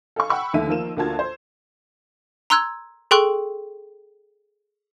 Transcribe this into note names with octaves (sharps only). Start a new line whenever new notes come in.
A4 F5 G#5 C#6
F#5 G5 B5 C#6 E6
D#2 D3 E3 A3 E5 D#7
D#3 F3 A#3 E7
D2 A#3 F4 F#4 A5 G#6
C5
A#5 C6 E6 F#6 G#6
G#4 A4 G5 C6 C#6 F#6